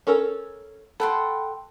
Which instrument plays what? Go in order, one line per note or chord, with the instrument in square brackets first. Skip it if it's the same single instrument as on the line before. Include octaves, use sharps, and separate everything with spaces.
[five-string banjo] C#4 A4 A#4
[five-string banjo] A4 [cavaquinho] F#5 G5 C6 [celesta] A5 B5